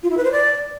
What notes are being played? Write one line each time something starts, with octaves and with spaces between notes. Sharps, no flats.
F4
E4
B4
C5
D5